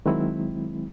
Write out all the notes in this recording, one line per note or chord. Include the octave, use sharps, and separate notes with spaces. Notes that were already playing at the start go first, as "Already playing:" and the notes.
D#3 F#3 G#3 C4 E4